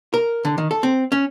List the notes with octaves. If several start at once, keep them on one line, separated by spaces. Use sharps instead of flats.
A#4
D3
D#3
A4
C4
C#4